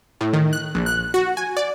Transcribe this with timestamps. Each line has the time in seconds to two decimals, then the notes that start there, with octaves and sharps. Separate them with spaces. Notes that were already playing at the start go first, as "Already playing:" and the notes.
0.21 A2
0.33 D#3
0.53 F#6
0.75 A#1
0.86 F#6
1.14 F#4
1.37 G#5
1.57 D5